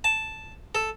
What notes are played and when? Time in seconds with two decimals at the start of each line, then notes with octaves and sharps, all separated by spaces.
0.04 A5
0.75 A4